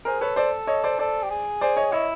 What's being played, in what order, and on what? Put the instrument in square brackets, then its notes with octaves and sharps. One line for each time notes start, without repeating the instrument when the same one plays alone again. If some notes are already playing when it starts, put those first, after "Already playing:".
[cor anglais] G#4 [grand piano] A#4 C5
[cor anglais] A4 [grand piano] B4 C#5
[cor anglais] A4 [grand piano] C5 D5
[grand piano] C#5 D#5
C5 D5
[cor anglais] A4 [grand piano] C5 D5
[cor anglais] G4
G#4
[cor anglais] G#4 [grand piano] C5 D5
[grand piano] C#5 D#5
[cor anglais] E4 [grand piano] C#5 D#5